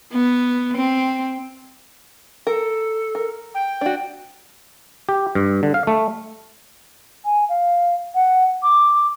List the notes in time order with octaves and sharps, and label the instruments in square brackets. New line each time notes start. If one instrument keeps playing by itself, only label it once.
[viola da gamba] B3
C4
[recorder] A4 [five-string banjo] A#4
[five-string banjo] A#4
[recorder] G5
[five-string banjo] D4 F#4
[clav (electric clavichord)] G4
G2
D3
F5
A3
[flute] G#5
F5
F#5
D6